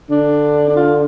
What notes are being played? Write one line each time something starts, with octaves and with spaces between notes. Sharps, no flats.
D3 D4
D4
F4